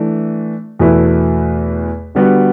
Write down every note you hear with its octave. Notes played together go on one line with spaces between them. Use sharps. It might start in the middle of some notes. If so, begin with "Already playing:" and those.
Already playing: E3 A3 D4
E2 B2 A3 E4 B4
D3 G3 B3 F#4